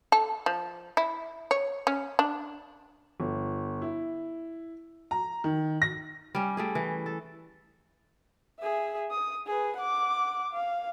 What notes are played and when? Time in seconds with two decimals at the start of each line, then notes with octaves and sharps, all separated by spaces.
0.12 A4
0.46 F3
0.97 E4
1.51 C#5
1.87 C#4
2.19 D4
3.20 G1
3.82 E4
5.11 A#5
5.44 D#3
5.82 A#6
6.35 G3 C#4
6.57 G3 A3 G#4
6.75 E3
7.06 A4
8.60 G#4 E5
9.11 D#6
9.47 G#4 B4
9.76 F#5 D6
10.52 F5